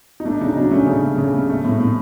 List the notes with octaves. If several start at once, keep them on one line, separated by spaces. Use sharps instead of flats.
D#4
A3 D4
C#3 D#4
F#3 D4
A3 C#4
C#3
A3
C#3
A3
A3
A2
A2